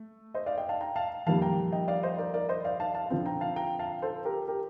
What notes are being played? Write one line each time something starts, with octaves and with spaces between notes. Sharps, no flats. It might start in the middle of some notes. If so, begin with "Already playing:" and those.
Already playing: A3
C5 D#5
D5 F5
D#5 G5
F5 A5
G5 A#5
F5 A5
F2 D#3 G3 A#3 F5 A5
G5 A#5
D#5 G5
D5 F5
C5 D#5
A#4 D5
A#4 D5
C5 D#5
D5 F5
F5 A5
F5 A5
D3 F3 C4
G5 A#5
F5 A5
G5 A#5
F5 A5
A4 C5
G4 A#4
G4 A#4